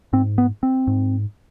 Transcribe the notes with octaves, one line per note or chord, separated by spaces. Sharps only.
G#2 C4
B3
C4
G#2